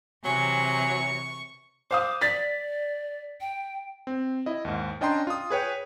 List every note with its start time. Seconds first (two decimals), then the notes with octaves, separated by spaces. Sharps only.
0.24 C3 E3 F#3 C#5 G#5 C#6
1.91 C5 F5 D6 D#6
2.21 D5 A6 B6
3.41 G5
4.07 C4
4.46 E4 D#5
4.65 D#2 G#2
5.01 C#4 D4 D#5 G5 A#5 C6
5.27 F4 D#6
5.50 G#4 B4 C#5 G5